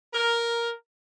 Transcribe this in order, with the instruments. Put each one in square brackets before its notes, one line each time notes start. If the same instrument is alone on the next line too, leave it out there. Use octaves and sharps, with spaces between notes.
[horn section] A#4